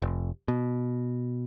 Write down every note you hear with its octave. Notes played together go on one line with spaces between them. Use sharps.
F1
B2